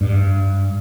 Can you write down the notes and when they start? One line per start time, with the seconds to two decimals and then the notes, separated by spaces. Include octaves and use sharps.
0.01 G2